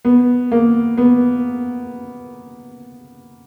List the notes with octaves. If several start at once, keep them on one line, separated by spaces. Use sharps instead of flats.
B3
A#3
B3